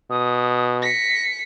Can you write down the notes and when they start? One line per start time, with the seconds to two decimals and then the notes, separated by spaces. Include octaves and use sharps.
0.10 B2 D#6
0.82 A#6 B6 C#7